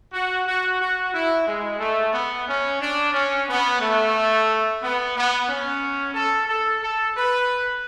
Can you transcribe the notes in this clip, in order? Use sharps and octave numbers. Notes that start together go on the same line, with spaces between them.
F#4
F#4
F#4
E4
G#3
A3
B3
C#4
D4
C#4
B3
A3
B3
B3
C#4
A4
A4
A4
B4